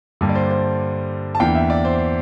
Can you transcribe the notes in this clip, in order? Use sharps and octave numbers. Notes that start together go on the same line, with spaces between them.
G2 D3 G3 A#3 D4
D5
C5
C5
A5
E2 E3 A#3 D4 G5
E5
D5
C5